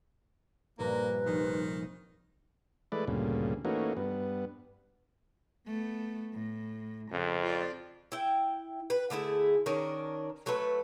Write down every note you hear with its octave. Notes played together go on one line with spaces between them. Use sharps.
A#1 G2 A#3 B4 A#5
F1 D#3
E3 G#3 A3 B4 D5
D2 G2 A#2 C#3
E3 A3 A#3 C#4 D#4 F#4
G2 B3
A3 B3
A2
F2 C#3
F4 D5
E4 G5
B4
D3 A3 E4 G#4
D#3 C#4 D4 A#4
F#3 A3 A4 B4